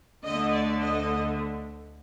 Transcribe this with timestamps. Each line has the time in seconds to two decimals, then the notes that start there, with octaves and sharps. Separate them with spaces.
0.25 D2 D3 A3 D#5
0.53 D5
0.82 D#5